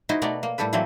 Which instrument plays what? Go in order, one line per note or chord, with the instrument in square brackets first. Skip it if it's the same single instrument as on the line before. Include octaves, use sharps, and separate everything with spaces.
[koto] D#4 E4 F#4 C5 D#5
B2 A3 B3 F#4 D5 A#5
A#3
A2 G3 G4 A4 B4
E3 F#3 A3 A#3 C4